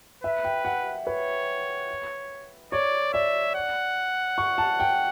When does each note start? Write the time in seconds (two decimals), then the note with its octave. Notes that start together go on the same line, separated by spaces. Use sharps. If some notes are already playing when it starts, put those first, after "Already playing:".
0.24 B4 E5
0.45 G5
0.65 F#5
1.07 B4 C#5
2.72 C#5 D5
3.13 D5 E5
3.55 F#5
4.38 C#6
4.58 A5
4.80 G5